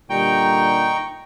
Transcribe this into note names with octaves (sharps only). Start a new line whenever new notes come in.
A#2 D3 G3 D#4 G5 A#5 C#6